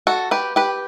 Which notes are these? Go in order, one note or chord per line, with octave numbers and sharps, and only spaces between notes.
F#4 A4
G4 B4
G4 B4